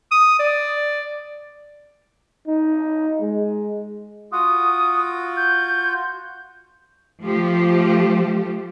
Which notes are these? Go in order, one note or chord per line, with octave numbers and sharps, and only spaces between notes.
D#6
D5
D#4
G#3
F4 F#4 D#6
G6
F3 A3 G4